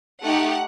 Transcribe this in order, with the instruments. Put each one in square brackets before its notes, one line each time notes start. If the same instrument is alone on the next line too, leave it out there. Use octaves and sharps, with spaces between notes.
[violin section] A3 D#4 G4 F#5